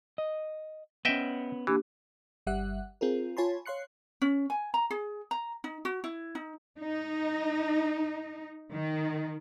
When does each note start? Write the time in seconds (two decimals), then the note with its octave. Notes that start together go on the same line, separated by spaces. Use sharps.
0.18 D#5
1.05 B3 C#4 D#5 E5 G5
1.67 E3 A#3 D4 G4
2.47 G1 G3 E5 F#5 F#6
3.01 C4 F4 G#4 A#4
3.37 F4 C#5 G#5 A5 B5 C6
3.65 C#5 F5 C6 F#6 C#7
4.22 C#4
4.50 G#5
4.74 A#5
4.91 G#4
5.31 A#5
5.64 D#4
5.85 F#4
6.04 E4
6.35 D#4
6.78 D#4
8.71 D#3